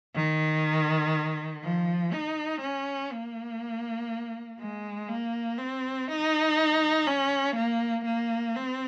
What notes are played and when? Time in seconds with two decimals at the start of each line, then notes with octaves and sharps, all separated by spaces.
0.15 D#3
1.63 F3
2.13 D#4
2.61 C#4
3.12 A#3
4.60 G#3
5.09 A#3
5.58 C4
6.08 D#4
7.07 C#4
7.56 A#3
8.05 A#3
8.56 C4